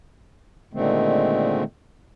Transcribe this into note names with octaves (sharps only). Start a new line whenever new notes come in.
A#2 D3 D#3 G#3 A3 C4